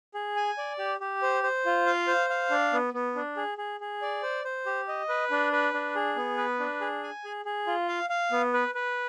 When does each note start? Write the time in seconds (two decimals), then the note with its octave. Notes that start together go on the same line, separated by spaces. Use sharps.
0.14 G#4
0.36 G#5
0.58 D5
0.79 G4
1.00 G4
1.22 C5
1.43 C5
1.66 F4
1.86 F5
2.07 C5
2.30 F5
2.50 D4
2.73 B3
2.94 B3
3.15 D4
3.37 G#4
3.58 G#4
3.80 G#4
4.02 D5
4.23 C5
4.45 C5
4.66 G4
4.88 D#5
5.09 B4
5.31 D4
5.52 B4
5.74 D4
5.95 G#4
6.16 B3
6.37 B4
6.59 D4
6.81 G#4
7.03 G#5
7.25 G#4
7.45 G#4
7.67 F4
7.88 F5
8.10 F5
8.32 B3
8.54 B4
8.75 B4